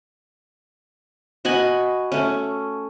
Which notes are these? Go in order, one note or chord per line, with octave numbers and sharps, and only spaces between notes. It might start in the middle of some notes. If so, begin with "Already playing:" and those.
F#4 D#5 G#5 B5
A3 C#4